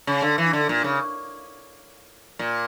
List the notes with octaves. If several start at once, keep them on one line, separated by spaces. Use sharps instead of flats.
C#3
D3
E3
D3
A#2
C#3
A#2